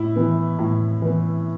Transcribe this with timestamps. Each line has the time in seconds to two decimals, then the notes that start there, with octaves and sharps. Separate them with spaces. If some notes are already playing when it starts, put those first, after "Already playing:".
Already playing: A2 E4
0.16 E3 B3
0.59 A2
1.02 E3 B3